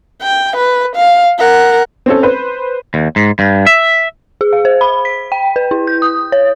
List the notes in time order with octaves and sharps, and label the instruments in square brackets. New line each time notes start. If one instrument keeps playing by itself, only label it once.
[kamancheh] G5
B4
F5
A#4 F#5
[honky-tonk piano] C4 C#4 A4
B4 C5
[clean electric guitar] D#2
G#2
G2
E5
[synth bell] G#4
F5
C5
B5
B6
G5
B4
E4
G6
D#6
C#5